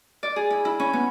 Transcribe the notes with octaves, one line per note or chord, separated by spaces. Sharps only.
D5
G#4
E4
E4
C#4
B3